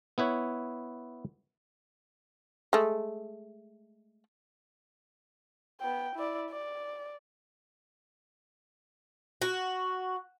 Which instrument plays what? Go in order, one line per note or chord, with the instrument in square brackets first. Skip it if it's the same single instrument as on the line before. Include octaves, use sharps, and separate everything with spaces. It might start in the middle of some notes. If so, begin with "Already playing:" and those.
[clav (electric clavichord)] B3 E4 B4 C#5
[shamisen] G#3 A3
[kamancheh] B3 G5
E4 D5
D5
[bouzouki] F#4